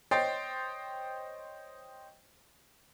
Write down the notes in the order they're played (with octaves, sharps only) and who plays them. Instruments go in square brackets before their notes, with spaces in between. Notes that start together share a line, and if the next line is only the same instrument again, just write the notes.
[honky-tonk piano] C5 C#5 D#5 G5 A6 C7